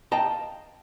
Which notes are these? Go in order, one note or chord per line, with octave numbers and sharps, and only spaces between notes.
D#5 F5 G5 A5 A#5